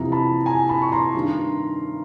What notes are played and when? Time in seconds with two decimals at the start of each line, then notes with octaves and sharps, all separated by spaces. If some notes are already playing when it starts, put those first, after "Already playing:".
Already playing: F2 C3 E3 A#5
0.12 A5 B5
0.46 G#5 A#5
0.69 A5 B5
0.82 C#6
0.92 A#5 C6
1.14 G2 D#3